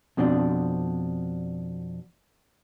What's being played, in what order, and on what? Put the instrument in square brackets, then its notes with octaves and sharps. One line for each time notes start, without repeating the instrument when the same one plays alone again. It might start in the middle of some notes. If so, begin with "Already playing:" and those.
[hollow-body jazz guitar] F2 B2 C4 D4